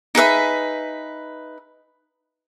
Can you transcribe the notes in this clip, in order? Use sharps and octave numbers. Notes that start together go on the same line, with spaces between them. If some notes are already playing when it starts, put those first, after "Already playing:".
D#4 G#4 B4 E5